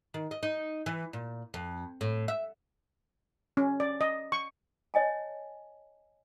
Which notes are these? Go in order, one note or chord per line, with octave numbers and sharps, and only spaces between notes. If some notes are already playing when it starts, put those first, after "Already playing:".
D#3
D#5
D#4
E3
A#2
F2
A2
E5
C#4
D5
D#5
C#6
C#5 D#5 G#5 A5